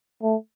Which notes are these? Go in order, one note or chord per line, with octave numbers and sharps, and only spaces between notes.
A3